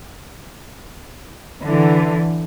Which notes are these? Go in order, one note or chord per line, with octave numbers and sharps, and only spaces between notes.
D3 E3